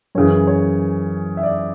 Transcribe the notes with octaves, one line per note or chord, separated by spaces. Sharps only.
F#2 C#3 E3 C#5
C#5
E5
D5